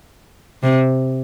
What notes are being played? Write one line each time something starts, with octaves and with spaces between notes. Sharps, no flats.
C3